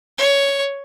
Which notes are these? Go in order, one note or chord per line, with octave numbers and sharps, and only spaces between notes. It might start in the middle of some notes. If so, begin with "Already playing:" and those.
C#5